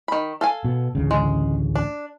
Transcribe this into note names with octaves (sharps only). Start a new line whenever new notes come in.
D#3 B5
A4 F5 G#5
B2 B3
A1 D2 C#3
G#3
D4